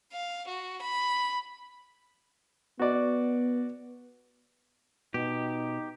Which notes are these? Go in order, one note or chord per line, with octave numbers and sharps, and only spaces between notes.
F5
F#4
B5
B3 F#4 D5
B2 D#4 G4